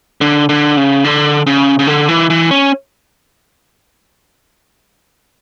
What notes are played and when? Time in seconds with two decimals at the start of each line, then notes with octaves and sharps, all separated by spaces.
0.21 D3
0.49 D3
0.77 C#3
1.04 D3
1.47 C#3
1.79 C#3
1.87 D3
2.08 E3
2.30 E3
2.51 C#4